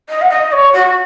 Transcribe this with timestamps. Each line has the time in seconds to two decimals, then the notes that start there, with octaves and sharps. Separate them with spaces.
0.09 D#5
0.21 F#5
0.30 D#5
0.52 C#5
0.73 F#4